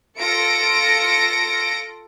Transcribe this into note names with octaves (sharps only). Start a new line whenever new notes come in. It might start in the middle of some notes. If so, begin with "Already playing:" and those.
F4 A4 A#6 C#7 D7